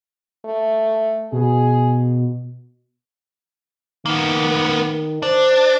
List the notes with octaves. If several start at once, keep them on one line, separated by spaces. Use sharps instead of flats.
A3
B2 G#4
D#3 A#3 B3
D4 C5